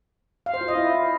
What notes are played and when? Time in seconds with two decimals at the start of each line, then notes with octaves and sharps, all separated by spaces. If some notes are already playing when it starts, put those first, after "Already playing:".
0.46 F5
0.54 C5
0.61 F4
0.68 D#5
0.76 E4